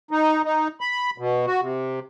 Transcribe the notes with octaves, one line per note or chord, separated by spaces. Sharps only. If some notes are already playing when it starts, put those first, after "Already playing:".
D#4
D#4
B5
B2
F#4
C3